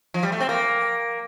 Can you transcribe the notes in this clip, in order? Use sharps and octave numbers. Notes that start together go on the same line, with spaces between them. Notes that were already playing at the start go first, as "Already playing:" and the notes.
F3
G3
A3
C4
A#3